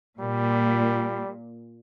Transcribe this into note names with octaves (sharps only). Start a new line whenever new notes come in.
A#2 G3